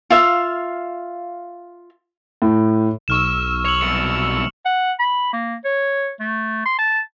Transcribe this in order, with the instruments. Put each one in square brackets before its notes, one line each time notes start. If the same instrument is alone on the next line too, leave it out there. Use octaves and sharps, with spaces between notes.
[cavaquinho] F4 E5 F5
[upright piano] A2
[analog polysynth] B1 E6 [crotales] C#6 F6 E7
[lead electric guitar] C#5 [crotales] F7 F#7
[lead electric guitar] C2 B2 [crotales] C#7
[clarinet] F#5
B5
A#3
C#5
A3
C6
A5